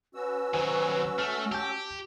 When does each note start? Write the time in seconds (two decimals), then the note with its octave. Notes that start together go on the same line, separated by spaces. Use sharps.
0.15 C#4 F#4 B4 E6
0.54 D#3 F#3 C5 G#5
1.18 A3 F6
1.52 G4 A5 G6